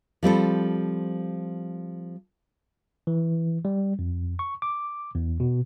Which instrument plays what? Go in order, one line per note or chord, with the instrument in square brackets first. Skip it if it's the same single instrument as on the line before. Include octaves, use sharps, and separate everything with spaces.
[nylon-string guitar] F3 G3 C4 A4
[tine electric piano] E3
G3
F2
C#6
D6
E2
B2